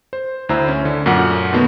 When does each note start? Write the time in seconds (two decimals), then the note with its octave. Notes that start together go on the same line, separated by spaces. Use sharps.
0.13 C5
0.49 D2 E4 C5 A#5 E6
0.68 C#4
0.85 D3
1.06 F#2 A#2 A3 F#5 F6
1.53 B2 D#3 A3 B3